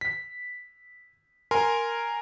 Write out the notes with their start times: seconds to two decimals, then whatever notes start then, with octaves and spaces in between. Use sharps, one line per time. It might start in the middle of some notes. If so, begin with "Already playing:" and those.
0.01 B6
1.51 A#4 G#5 C6